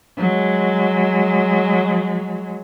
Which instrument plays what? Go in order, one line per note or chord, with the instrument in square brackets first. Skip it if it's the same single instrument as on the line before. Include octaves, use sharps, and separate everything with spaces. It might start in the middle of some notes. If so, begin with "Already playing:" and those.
[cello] F#3 G#3